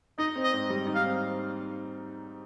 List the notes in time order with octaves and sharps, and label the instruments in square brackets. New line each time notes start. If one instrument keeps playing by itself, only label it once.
[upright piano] D#4 [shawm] D#5
[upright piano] C4
[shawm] D#5
[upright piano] G#2
G3
D#4
[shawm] F5
[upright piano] C4